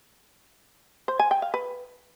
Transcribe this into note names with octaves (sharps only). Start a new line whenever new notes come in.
C5
G#5
G5
F5
B4